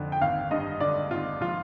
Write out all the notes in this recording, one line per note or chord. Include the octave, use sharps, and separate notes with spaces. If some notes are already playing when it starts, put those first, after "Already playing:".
Already playing: F2 D3
G5
G#1 F5
G2 D#5
D3 D5
G#1 F4
F3 F4